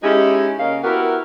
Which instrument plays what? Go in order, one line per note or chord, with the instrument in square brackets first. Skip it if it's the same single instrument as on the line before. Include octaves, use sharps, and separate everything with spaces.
[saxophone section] G#3 C#4 D#4 E4 G4
C#3 A#3 C#4 A#4 D#5 F5
B3 E4 F#4 G4 A#4